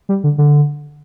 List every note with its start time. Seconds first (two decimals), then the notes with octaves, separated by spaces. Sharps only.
0.09 G3
0.24 D3
0.38 D3